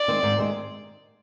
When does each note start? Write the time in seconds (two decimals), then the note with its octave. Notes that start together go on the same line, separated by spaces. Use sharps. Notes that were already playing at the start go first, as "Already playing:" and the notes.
Already playing: D5
0.08 D#3 G#3 C4
0.23 G#2
0.38 D#3 G#3 C4